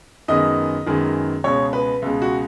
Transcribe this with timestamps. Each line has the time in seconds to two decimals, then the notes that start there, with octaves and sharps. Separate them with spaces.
0.28 F#2 D#3 G#3 B3 D#5
0.86 F#2 D#3 G#3 B3
1.44 C#2 B2 G#3 C#5
1.73 B4
2.02 C#2 B2 G#3
2.22 F#4